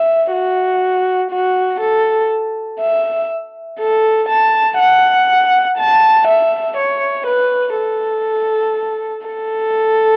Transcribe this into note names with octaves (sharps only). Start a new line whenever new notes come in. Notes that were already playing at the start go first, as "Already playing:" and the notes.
Already playing: E5
F#4
F#4
A4
E5
A4
A5
F#5
A5
E5
C#5
B4
A4
A4